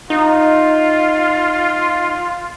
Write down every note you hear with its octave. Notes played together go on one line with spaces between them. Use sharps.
D#4 F4